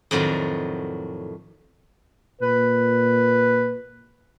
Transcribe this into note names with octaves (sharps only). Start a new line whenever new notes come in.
F2 A2 D#3 F#3 D4
A#2 B4